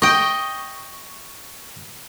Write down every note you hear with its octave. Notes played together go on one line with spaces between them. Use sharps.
D#5 G5 C#6